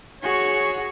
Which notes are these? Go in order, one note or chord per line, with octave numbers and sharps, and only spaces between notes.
F#4 G#4 C#5